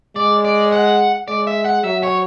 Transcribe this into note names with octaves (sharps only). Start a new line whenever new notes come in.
G#3 D5
D5
F#5
G#3 D5
E5
F#5
F#3 E5
C#5